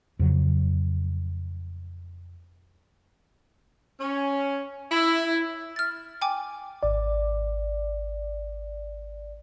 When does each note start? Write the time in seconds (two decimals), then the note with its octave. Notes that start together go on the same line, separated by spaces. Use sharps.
0.19 F2 C#3 F#3
4.00 C#4
4.92 E4
5.76 F6 A6
6.21 G5 G#5 D6
6.83 G#1 D5